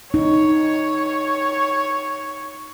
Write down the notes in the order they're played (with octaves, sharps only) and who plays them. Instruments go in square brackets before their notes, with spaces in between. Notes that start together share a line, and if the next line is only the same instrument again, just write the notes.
[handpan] D#4 [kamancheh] C#5